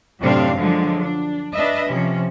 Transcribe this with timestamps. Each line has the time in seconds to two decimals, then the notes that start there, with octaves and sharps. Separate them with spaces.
0.21 F#2 A2 C3 C4 D4 F5
0.57 D3 F3 F#3 G#3
1.01 D4
1.53 D4 B4 D#5 E5
1.87 C3 F3 C#4